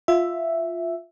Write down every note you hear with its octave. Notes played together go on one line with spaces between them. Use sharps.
F4 E5